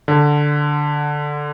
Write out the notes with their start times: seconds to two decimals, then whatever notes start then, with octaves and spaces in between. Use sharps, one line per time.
0.08 D3